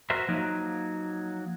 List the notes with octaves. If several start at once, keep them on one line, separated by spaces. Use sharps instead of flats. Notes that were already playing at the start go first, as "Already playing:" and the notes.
F#4 A#4 C5 E5
F3 F#3 A#3 D#4